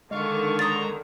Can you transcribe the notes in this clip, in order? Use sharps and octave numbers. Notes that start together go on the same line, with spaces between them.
D3 D#3 G#3 F4 F5 C#6
C5 C#5 A#5 D#6 A6